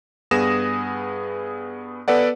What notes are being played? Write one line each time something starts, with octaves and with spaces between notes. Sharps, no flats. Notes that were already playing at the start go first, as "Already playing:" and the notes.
G2 B3 G#4 D#6 A#6 E7
B3 A4 B4 D5 F#5